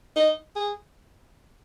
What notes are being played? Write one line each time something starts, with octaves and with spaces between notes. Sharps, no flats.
D#4
G#4